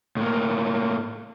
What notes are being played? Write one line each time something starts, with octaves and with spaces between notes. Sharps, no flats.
A2 A#3